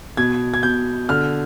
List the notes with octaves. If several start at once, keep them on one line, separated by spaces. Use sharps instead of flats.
B2 G#6
G#6
B2 G6
D3 F6